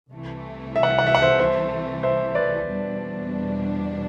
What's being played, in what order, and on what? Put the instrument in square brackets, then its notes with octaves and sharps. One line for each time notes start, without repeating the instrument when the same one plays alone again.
[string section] C2 C3 E3 A3
[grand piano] E5
F#5
E5
F#5
E5
F#5
C5 E5
C5 E5
C5 E5
B4 D5
[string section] E2 B2 G3 D4